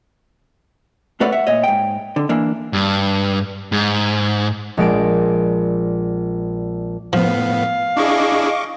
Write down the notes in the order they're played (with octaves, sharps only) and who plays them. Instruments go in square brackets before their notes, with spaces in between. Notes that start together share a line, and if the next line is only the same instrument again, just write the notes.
[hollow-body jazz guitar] A2 A3 B4 C#5 D5 F#5
E5 F#5
A#2 C#5 D#5
G#2 G5
D3
E3 A#3 D4
[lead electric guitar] G2
G#2
[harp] A#1 G#3 D5 D7
[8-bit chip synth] A2 B3 [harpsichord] F3 [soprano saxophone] F5
[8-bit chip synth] D4 E4 G#4 [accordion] D#5 C#6 D6